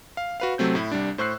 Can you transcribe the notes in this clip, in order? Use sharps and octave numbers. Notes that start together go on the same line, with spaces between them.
F5
F#4 B4 F5
C3 F#3 A3 C4 G6
A2 E4
C2 G3 D4
A2 C5 C#6 E6 F#6 C7